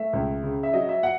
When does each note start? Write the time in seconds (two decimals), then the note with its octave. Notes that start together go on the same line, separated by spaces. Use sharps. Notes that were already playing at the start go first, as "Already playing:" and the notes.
Already playing: A3 E5
0.13 C#2
0.43 C#3
0.63 E5
0.73 F#3 D#5
0.89 E5
1.03 F#5